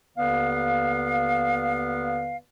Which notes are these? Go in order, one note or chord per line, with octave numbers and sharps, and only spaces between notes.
D#2 D3 B3 B4 D5 F5